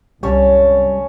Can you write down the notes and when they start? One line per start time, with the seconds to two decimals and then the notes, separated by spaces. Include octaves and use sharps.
0.23 C2 F#2 G3 C#4 C#5 A5